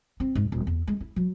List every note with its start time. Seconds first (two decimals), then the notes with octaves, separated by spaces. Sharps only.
0.20 C4
0.35 G#2
0.52 D#1
0.67 E2
0.87 G#3
1.01 E4
1.16 F#3